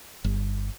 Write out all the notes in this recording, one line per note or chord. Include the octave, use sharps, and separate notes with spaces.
G1